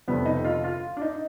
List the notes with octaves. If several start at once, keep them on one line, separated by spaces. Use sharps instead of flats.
F1 F2 D3 G3 B3
D#4
F4
F4
D4
D#4